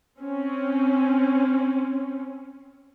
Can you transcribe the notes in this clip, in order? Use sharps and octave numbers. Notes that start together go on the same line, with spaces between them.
C4 C#4